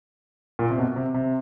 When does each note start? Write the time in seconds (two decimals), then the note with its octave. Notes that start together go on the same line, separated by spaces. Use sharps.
0.59 A#2
0.70 C3
0.78 B2
0.96 C3
1.14 C3